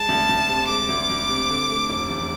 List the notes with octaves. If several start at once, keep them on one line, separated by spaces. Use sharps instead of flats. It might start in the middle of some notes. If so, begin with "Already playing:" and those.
Already playing: G#3 A5
D2
D2
C3
G#3 D6
D2
D2
C3
D3
A3
F1
E2